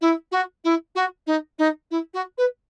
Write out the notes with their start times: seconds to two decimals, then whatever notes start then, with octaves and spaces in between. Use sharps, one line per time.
0.01 E4
0.31 F#4
0.64 E4
0.95 F#4
1.26 D#4
1.58 D#4
1.91 E4
2.14 F#4
2.38 B4